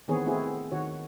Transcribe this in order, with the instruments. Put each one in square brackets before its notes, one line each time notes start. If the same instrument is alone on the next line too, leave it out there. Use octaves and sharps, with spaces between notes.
[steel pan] D#3 E3 B3 C4 G#4 C#5
A3 C4 E4 F#4 G#4
D#3 F#4 C#5